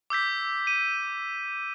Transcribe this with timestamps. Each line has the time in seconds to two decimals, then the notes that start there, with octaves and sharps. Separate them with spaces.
0.10 D6 E6 G6 B6
0.67 D#7